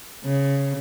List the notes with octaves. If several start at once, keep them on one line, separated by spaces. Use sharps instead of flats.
C#3